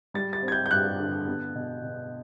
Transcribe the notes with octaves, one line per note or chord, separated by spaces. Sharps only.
G3 A6
A6
C4
G#6
G6
G6
G2 F#6
D3
B3
B2
B2